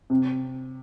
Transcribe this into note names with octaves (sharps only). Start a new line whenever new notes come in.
C3